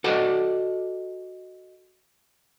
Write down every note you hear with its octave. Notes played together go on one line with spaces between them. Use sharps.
F#4 A4 D5 D#5